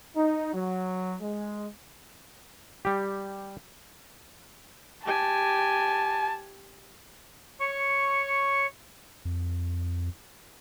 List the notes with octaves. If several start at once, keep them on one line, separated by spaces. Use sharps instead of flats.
D#4
F#3
G#3
G3 G4
G4 G#5 A5
C#5 C#6
F2